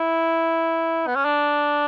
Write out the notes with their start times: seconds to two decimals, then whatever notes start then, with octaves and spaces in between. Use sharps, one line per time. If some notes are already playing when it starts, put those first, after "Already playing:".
Already playing: E4
1.07 B3
1.15 C#4
1.25 D4